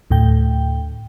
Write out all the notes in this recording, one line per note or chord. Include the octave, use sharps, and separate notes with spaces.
D2 A2 G5